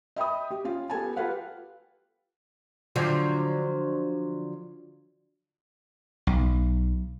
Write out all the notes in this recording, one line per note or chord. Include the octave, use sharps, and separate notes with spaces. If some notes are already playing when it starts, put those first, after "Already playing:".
D#5 E5 G5 B5 D#6
G4
C#4 F4
B3 G4 A4 G#5 A5
F4 G4 A4 B4 F5 F#5
D3 F3 F#3
B1